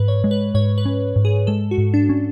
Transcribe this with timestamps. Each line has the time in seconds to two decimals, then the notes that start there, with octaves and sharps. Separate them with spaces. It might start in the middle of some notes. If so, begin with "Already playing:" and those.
Already playing: G#2 B4
0.08 C#5
0.24 G#3
0.31 B4
0.54 G#2 C#5
0.78 B4
0.85 C#4
1.16 G#2
1.25 G#4
1.47 G#3 A4
1.71 F#4
1.78 G#2
1.94 D4
2.09 C#4